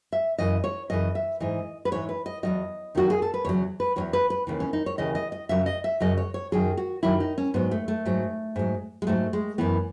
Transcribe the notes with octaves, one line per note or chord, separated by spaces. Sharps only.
E5
F#2 C#3 E3 D#5
C#5
F#2 C#3 E3 D#5
E5
G#2 E3 D#5
B4
G#2 E3 C#5
B4
D#5
E2 D#3 F#3 D#5
E2 D#3 F#3 F#4
G#4
A4
B4
E2 C#3 F#3 C#5
B4
E2 C#3 F#3 C#5
B4
B4
D#2 C#3 E3
C#4
D#4
C#5
D#2 C#3 E3 D#5
D#5
D#5
F#2 C#3 F#3 E5
D#5
E5
F#2 C#3 F#3 D#5
C#5
C#5
F#2 D#3 F#3 G#4
F#4
F#2 D#3 F#3 E4
D#4
C#4
G#2 F#3 B3
A3
A3
G#2 F#3
G#2 F#3
G#3
G#2 F#3 A3
G#3
F#2 E3 B3